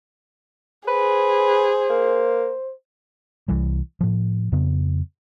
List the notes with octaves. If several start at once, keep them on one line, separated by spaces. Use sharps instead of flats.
G#4 B4 C5
A#3
C2 E3 G3
A2 F3
F2 C#3 B3